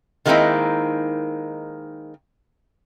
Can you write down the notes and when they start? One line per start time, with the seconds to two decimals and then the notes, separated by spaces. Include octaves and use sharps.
0.26 D#3 G#3 A#3 C4 D#4 E4